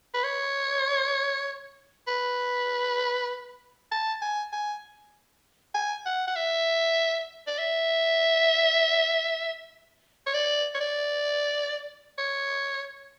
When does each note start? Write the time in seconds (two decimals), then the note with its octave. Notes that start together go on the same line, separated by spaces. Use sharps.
0.14 B4
0.24 C#5
2.07 B4
3.92 A5
4.22 G#5
4.53 G#5
5.74 G#5
6.06 F#5
6.27 F#5
6.36 E5
7.47 D5
7.58 E5
10.27 C#5
10.34 D5
10.75 C#5
10.80 D5
12.18 C#5